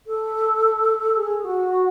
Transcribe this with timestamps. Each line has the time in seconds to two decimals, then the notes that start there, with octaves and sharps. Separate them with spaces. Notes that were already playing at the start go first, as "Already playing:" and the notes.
0.07 A4
1.16 G#4
1.45 F#4